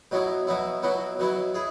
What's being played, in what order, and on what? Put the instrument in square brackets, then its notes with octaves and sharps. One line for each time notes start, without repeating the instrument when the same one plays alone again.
[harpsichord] B2 F#3 B3 E4
B2 F#3 B3 E4
B2 F#3 B3 E4
B2 F#3 B3 E4
E4 G#4